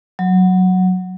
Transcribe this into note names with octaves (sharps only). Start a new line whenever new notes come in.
F#3